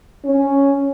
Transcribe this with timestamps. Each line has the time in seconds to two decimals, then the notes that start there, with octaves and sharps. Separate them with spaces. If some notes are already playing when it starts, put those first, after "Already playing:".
0.25 C#4